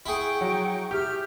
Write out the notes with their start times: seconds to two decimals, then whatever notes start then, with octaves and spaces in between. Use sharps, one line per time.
0.06 E4 G#4 F#5 G5 C#6
0.41 F#3
0.91 G4 E5 F6